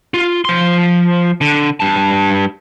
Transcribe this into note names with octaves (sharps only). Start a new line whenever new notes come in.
F4
F3 C6
D3
G2 A5